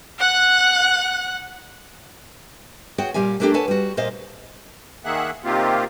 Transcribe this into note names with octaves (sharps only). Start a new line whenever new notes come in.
F#5 F#6
F#4 G#4 C#5 F#5 G5
A#2 G3 G#3 G4 F5 G#5
A3 A#3 D4 F4 G4 A4
A4 B4 C#5 F#5 G#5 A5
G3 F#4
A#2 C5 D#5 F5
D#3 A#3 G#4 E5 F#5 F#6
C3 D#3 A#3 C4 F4 G4